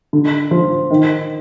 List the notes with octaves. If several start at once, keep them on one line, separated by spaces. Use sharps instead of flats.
D3
F3
D#3